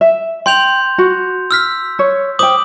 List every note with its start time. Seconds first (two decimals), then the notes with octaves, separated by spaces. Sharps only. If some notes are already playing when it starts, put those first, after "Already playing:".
0.01 E5
0.46 G5 C6 G6 F7
0.98 F#4
1.51 E6 F6 B6
1.99 C#5
2.39 C5 G5 D6 D#6 F#7